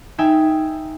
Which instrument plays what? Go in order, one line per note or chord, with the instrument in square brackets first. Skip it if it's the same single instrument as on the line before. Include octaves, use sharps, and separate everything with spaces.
[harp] D#4 E5 G5 G#5